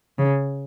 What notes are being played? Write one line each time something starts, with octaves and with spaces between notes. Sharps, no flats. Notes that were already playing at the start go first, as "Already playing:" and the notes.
C#3